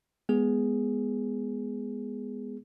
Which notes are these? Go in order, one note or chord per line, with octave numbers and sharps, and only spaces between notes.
G#3 B3 G#4